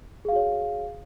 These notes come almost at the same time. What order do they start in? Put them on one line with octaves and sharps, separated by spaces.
G#4 F5 F#4 C#5